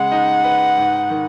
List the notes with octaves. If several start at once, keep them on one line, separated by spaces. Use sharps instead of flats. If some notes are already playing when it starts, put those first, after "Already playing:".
Already playing: C#3 G#3 F#5
D#4
B4
G#2
D#3